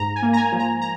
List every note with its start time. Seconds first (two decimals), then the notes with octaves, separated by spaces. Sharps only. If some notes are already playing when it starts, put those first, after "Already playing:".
Already playing: G#2 A#5
0.16 G#5
0.22 A#3
0.33 A#5
0.37 G#5
0.52 F3
0.59 A#5
0.81 A#5